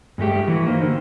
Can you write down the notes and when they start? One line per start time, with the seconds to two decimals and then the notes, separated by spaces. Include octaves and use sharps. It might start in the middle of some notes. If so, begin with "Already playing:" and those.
0.18 G2 G#3 A3 G4
0.48 E3 F#4
0.66 A#3 D#4 C5
0.82 D3